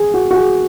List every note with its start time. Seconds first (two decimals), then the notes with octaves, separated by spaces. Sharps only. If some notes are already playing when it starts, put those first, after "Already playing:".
Already playing: G#4
0.14 F#4
0.31 F#4
0.36 G#4